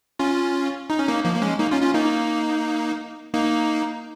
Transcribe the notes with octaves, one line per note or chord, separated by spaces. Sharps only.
C#4 F4
D#4
C#4
A#3 D#4
F3 A#3
A#3
G#3 C#4
A#3 D#4
C#4 F4
C#4 F4
A#3 D#4
A#3 D#4